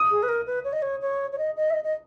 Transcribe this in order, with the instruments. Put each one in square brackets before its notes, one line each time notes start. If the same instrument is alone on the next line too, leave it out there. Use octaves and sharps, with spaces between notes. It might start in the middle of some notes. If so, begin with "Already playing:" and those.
Already playing: [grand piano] D#6
[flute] G#4
B4
A#4
B4
C#5
D#5
C#5
C#5
C#5
D#5
D#5
E5
D#5
D#5